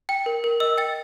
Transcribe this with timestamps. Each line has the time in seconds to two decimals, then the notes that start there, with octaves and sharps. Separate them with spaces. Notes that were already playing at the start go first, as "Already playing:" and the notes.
0.09 G5
0.26 A#4
0.44 A#4
0.60 D#5 E6
0.78 G5 A6